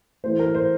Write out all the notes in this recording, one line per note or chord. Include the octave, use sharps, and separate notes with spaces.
A2 E3 A3 E4 C5
A#4
C5